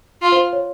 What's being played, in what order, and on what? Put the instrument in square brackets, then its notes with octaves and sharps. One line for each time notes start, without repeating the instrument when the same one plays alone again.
[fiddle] F4
[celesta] C5
C#5